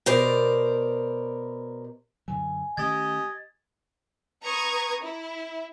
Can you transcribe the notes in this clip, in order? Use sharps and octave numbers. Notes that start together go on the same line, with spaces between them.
B2 A#4 C5 D5
F#2 D3 F#3 G#5
D#3 A3 C#4 G4 D#5 G#6 A6
B4 A#5 C#6 D#6 G#6
E4